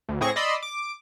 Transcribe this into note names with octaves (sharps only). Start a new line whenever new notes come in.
D2
A2 C4 G#4 C#6 A#6
D5 D#5 B5 C6 E6
D6